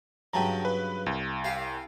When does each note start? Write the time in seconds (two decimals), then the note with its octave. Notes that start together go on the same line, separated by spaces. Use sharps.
0.33 G2 C#3 F#3 G5 A5 A#5
0.65 B4
1.06 C2
1.44 G4 F5